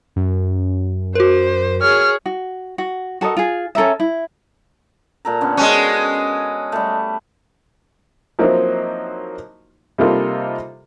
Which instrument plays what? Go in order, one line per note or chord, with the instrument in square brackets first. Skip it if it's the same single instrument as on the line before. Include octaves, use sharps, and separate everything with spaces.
[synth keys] F#2
[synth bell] F#4 A#4 [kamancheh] C5
[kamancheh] G#4 C#5 [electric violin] F6
[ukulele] F#4
F#4
F#4 A4 A#4 D#5
F4 G#4
C#4 A4 A#4 E5
E4
[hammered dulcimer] A#2 A4 A#5
D3 B3 C#4
[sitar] G#3 C#4 [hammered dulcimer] F#4 A5 C#6
[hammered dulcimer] G3 A3
[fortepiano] F3 F#3 A#3 C4 D#4 E4
C3 G3 A#3 D#4 F4 A4